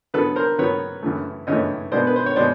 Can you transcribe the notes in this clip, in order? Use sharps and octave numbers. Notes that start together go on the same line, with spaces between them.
C#3 F#3 B3 A4 B4
A#4 C5
C#3 F#3 B3 B4 C#5
F#2 C#3 E3 A3
F#2 C#3 E3 A3 C#5 D#5
B2 G#3 B3 C5 D5
B4
C5
C#5
B2 G#3 C5 D5